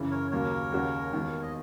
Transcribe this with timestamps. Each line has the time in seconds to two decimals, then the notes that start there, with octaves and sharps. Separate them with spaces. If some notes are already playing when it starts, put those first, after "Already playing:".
Already playing: F#2 C#3 E3
0.11 A#4 C#5
0.31 D#2 C#3 F#3 A#3 A#4 C#5
0.72 D#2 C#3 G#3 C#4 F#4
1.13 E1 D#2 D#3
1.42 D#5